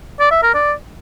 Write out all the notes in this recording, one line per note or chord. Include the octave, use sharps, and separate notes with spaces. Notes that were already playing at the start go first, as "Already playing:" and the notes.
D5
E5
A#4
D5